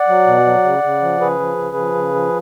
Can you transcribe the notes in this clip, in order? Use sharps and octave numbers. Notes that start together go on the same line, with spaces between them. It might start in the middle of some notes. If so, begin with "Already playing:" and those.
Already playing: D5 F#5
F#3
B2
F#3
C#3
C#3
F3
C#3 G#4 B4
F3
C#3
F3
C#3
F3